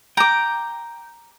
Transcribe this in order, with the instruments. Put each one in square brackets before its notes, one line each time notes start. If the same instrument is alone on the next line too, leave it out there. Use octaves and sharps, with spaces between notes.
[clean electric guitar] G5 [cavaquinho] A#5 D6